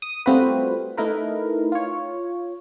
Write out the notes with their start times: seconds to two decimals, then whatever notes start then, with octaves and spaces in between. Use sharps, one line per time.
0.02 D#6
0.26 G3 A3 C4 F4 F#4 B4
0.97 A3 D#4 E4 A#4 B4
1.72 F4 C#5